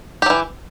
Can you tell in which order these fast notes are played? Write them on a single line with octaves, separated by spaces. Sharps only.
G4 F#3 E3